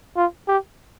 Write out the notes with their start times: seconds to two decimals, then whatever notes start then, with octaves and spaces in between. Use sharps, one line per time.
0.16 F4
0.48 G4